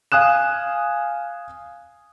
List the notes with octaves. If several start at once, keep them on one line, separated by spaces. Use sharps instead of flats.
F5 G#5 D#6 F#6 E7